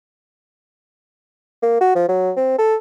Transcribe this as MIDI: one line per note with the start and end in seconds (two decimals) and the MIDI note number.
1.62 1.76 58
1.81 1.93 66
1.95 2.08 53
2.08 2.31 54
2.37 2.53 60
2.58 2.75 69